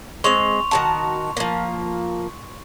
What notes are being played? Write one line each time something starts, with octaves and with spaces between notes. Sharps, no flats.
G#3 C4 C6 C#6 F7
D#3 F#4 A5
F3 A#3